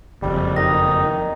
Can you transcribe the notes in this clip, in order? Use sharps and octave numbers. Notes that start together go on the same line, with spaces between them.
F#1 F2 G3
D#3 D#4 A#6